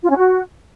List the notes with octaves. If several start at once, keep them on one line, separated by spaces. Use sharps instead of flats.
F4
C#4
F#4